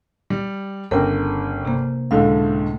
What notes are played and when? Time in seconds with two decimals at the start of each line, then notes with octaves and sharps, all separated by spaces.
0.30 G3
0.91 G1 C#3 A#4 G5
1.65 C3 A#3
2.11 C#2 A2 D3 F5